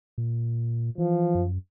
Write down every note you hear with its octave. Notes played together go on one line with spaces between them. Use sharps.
A#2
E3 F3
F#2